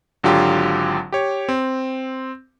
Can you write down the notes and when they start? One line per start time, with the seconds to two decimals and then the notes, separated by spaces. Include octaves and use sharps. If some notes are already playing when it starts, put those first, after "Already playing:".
0.24 G#1 D3 F#3 F4 G4
1.12 G4 C#5
1.49 C4